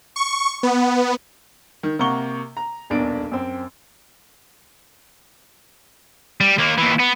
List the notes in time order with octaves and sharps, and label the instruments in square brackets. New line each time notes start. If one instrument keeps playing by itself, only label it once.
[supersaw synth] C#6
B3
[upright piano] D#3
C3 A#3 F#5 A#5 C#6 G7
A#5
D#1 B1 E2 D4 A#4 D7
F#2 C4
[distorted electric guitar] G3
D#2 A#3
D#2 E3
B3